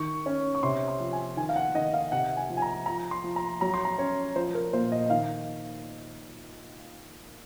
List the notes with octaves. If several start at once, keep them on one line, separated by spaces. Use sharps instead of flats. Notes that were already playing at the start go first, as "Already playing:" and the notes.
Already playing: D#3 C#6
C#4
C#6
C3 C6
C6
F3
G#5
D#3 G#5
F5
F#5
D#3 D#5
F5
C3 F#5
G#5
F3
G#5
A#5
F3 A#5
C6
F3
A#5
F#3 A#5
C6
A#5
C#4 C#5
F3 C5
A#4
A#2 C5
D#5
D#5
D#3 F5